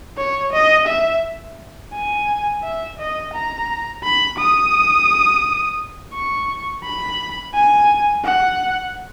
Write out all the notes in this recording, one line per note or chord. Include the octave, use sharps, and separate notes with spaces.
C#5
D#5
E5
G#5
E5
D#5
A#5
B5
D#6
C#6
B5
G#5
F#5